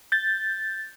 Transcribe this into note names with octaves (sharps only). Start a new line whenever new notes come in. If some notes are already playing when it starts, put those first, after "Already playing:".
G6 A6